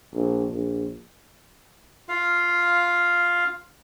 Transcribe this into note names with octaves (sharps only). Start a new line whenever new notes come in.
A#1
A#1
F4 F5